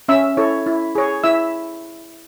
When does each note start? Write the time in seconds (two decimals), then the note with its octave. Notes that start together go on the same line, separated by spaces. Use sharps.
0.08 C#4 E5 E6
0.37 E4 A4 C#5
0.66 E4
0.95 G#4 C#5
1.24 E4 E5 E6